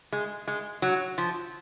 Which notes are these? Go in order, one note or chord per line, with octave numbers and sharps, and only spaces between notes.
G#3
G#3
F#3
F3